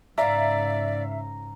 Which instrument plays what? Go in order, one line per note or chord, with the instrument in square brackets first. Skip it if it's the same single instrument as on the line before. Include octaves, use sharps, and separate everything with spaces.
[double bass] G#2 C#3 [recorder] D5 [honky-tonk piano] E5 F5 [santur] A#5